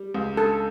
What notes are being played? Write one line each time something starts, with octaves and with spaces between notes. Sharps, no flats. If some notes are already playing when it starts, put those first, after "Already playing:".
Already playing: G3
C#2
A4